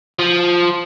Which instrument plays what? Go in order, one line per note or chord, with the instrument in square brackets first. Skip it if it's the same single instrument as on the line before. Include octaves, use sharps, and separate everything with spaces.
[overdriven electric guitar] F3